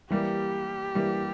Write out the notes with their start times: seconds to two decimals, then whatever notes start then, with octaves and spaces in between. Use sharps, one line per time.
0.10 E3 G3 A#3 G4
0.95 E3 G3 A#3